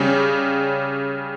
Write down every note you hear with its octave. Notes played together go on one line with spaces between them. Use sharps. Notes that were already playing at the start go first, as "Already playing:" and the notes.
Already playing: C#3 G3 C#4 G4